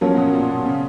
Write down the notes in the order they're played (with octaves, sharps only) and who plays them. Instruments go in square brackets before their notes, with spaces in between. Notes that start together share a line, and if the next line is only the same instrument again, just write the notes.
[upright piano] F3 A#3 C#4 [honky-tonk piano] F#3
[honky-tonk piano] B2
A#2
B2
C#3